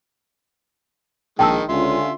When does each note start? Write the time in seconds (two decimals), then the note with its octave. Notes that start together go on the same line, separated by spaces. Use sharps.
1.39 A#1 D#3 G#3 G5 A5 E6
1.69 C#2 D3 C#4 F4 E5 C6